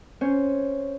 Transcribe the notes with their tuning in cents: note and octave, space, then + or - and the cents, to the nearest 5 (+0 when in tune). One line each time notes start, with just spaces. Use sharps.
C#4 +0 C5 +0